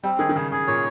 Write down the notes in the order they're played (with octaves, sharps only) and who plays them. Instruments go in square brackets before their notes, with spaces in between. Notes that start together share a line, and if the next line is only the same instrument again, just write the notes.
[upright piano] G3 [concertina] C4
[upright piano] D#3 [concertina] G#4
[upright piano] D#3
[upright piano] C#3 [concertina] G#4
[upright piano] C#3 [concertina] G#4
[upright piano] A#2 [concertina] C#5